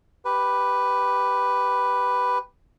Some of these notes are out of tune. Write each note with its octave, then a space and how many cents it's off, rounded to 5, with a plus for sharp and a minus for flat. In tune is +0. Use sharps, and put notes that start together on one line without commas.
G4 +0 B4 +0